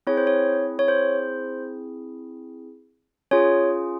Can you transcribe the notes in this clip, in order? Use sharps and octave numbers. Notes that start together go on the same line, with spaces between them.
C4 E4 G#4 C#5
C5
C#5
C#5
C5
C#4 F4 G#4 C#5